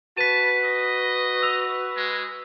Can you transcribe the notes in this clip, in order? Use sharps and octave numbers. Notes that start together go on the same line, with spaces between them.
F#4 B4 A5 B6 D#7
D#5
E6 F7
G#3